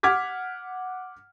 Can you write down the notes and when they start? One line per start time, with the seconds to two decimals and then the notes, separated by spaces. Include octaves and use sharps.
0.03 F#5 D6 F6 G#6 B6